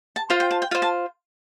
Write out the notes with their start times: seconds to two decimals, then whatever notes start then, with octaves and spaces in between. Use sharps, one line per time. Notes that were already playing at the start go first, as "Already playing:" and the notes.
0.16 A5
0.30 F4 C5 F5
0.40 G5
0.51 A5
0.62 G5
0.71 F4 F5
0.75 C5
0.82 A5